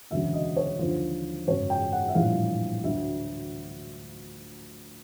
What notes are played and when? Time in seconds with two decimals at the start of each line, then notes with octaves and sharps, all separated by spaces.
0.10 E1 D2 C#3 F#3 E5
0.34 D#5
0.56 C#5
0.79 D#2 D3 F3 C5
1.47 G#1 F#2 C#3 F#3 C#5
1.70 G5
1.92 F#5
2.08 E5
2.15 A#1 A2 E3 G3 F5
2.84 D2 D3 F#3 E5